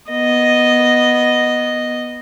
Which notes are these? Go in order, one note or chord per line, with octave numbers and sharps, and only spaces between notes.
B3 D#5